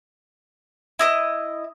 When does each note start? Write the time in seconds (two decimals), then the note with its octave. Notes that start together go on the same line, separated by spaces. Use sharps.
0.99 E4 D#5 D#6